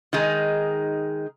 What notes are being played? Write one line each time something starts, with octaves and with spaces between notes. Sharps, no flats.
D#3 G#3 D#4 G#4